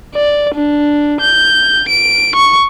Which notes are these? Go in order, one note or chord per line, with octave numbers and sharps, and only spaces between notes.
D5
D4
G6
D7
C#6